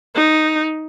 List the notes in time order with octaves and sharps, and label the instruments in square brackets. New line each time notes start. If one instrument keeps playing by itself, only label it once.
[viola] D#4